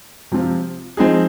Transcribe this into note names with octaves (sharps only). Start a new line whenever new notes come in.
C3 F3 C4 F4
F3 C4 D#4 G#4